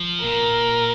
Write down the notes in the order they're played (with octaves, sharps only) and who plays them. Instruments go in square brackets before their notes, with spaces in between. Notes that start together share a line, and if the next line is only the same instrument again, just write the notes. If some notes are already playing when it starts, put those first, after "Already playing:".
Already playing: [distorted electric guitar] F3
[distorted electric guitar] A#2 [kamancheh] A#4